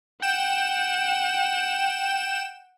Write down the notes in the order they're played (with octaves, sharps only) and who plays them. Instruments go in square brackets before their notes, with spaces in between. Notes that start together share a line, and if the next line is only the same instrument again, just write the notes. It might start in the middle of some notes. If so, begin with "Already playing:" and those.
[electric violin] F#5 [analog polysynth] G5 E7